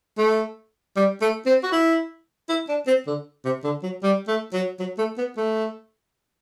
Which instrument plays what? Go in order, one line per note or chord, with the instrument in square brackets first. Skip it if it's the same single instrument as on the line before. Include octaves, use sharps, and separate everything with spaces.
[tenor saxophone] A3
G3
A3
C4
F#4
E4
E4
D4
C4
D3
C3
D3
F#3
G3
A3
F#3
F#3
A3
B3
A3